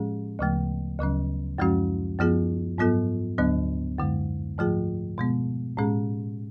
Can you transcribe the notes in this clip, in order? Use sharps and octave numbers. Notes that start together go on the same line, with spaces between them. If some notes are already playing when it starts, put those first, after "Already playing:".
Already playing: A2 F3 G#3 C#4 G#4
D2 C#3 F3 A3
D2 C#3 F#3 C#4
F#2 F3 G#3 C#4 F#4
F#2 F3 B3 F4 G#4
G#2 F#3 B3 F4 A4
D2 D3 F#3 B3 D4
F#2 D3 G#3
G#2 F3 A3 F4 G#4
B2 G#3 B3
A2 G#3 C#4 G#4